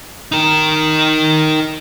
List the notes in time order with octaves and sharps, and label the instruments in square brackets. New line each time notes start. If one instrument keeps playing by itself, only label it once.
[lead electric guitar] D#4 A#4